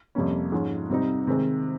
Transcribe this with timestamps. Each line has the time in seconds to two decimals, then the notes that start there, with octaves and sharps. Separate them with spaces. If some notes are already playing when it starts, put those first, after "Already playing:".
0.15 F2 C3 G3 A#3 C#4
0.52 G#2 F3 G#3 C#4 F4
0.90 C3 G3 C4 D#4
1.27 C3 D#3 G#3 C4